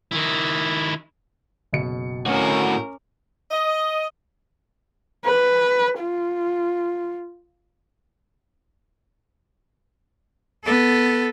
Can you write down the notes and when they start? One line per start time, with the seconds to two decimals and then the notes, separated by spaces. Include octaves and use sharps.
0.12 D#3 E4
1.73 F#1 B2 C#7
2.27 A2 C#4 F#4 A#4 D6 F6
3.51 D#5
5.25 B4
5.99 F4
10.64 B3 A4